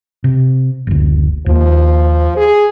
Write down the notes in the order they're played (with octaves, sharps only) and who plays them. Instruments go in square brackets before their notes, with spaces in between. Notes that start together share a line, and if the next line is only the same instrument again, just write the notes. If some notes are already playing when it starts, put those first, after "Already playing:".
[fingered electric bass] C3
F#1 D2
[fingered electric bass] D#2 A#3 [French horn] F3
[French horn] G#4